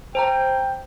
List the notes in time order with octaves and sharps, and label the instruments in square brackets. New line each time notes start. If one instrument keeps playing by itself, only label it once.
[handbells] C5 A5 A#5 [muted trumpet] G5